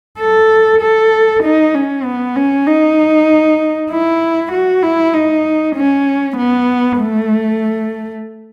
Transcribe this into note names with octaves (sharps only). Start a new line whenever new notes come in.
A4
A4
D#4
C#4
B3
C#4
D#4
E4
F#4
E4
D#4
C#4
B3
A3